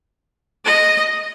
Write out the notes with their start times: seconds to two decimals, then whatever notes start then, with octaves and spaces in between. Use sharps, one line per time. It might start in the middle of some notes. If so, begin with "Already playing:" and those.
0.65 D#5